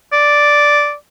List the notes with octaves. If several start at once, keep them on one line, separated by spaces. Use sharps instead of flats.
D5